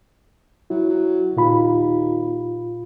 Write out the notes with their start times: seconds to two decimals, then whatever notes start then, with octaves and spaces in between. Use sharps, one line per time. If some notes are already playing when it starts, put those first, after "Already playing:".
0.70 F#3 E4
0.89 F#3
1.37 D#2 A#2 F4 B5